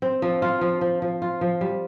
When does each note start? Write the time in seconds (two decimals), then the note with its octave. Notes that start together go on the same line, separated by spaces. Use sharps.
0.02 C4
0.22 F3
0.42 F4
0.61 F3
0.81 F3
1.02 F3
1.22 F4
1.41 F3
1.61 G3